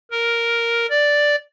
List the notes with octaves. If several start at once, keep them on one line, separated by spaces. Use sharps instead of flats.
A#4
D5